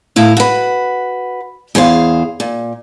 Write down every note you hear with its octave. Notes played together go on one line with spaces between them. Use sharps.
A2 E4 F5
F#4 B4
E2 G#4 C5 F5
A#2